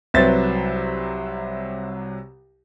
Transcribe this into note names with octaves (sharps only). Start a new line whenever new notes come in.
C2 C3 F#3 B4 C5 E5 A6